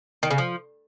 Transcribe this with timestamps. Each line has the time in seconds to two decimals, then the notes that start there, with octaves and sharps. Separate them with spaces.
0.23 D#3
0.30 C#3
0.38 F3